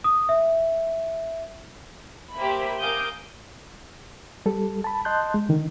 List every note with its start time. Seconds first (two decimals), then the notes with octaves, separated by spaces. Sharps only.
0.04 D#6
0.29 E5
2.36 A#3 G4 C5 E5 B5
2.80 A#4 F5 G#5 D6 D#6 G6
4.46 G3 A4
4.84 A5 B5
5.05 D#5 A5 C6 F#6 G6
5.34 G#3
5.49 D3 D#3